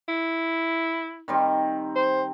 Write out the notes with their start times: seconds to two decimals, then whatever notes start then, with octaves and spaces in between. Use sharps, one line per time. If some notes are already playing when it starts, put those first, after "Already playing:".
0.08 E4
1.28 D#3 G3 C4
1.96 C5